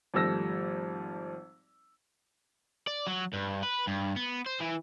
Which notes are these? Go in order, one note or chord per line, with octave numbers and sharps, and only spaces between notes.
G#1 F3 G3 A3 E6 A#6
D5
F#3
G2
B4
G2
B3
C5
E3